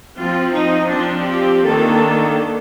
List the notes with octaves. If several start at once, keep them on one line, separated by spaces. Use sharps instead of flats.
F3 C4 F4
D#4
F3 C4 D4
G4
D#3 A#3 D4 A4